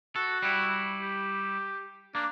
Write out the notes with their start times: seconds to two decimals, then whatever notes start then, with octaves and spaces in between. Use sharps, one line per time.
0.16 F#4 A4
0.42 G3 E4
1.02 G4
2.15 A#3 D4